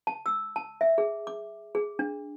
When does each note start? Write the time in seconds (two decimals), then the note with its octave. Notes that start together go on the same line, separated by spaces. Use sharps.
0.07 A5
0.26 E6
0.56 A5
0.81 E5
0.98 G#4
1.27 D6
1.75 G#4
1.99 D4